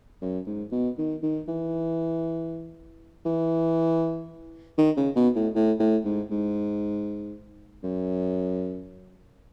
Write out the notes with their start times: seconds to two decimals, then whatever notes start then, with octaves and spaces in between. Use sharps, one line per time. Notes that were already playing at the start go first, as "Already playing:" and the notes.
0.22 F#2
0.47 G#2
0.72 B2
0.98 D#3
1.23 D#3
1.48 E3
3.25 E3
4.78 D#3
4.97 C#3
5.16 B2
5.35 A2
5.55 A2
5.80 A2
6.05 G#2
6.31 G#2
7.83 F#2